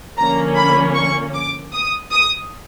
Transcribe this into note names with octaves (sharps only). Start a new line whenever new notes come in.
D3 F3 A#3 C#4 A#5
B5
C#6
D6
D#6
D#6